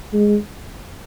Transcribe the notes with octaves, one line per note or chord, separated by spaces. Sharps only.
G#3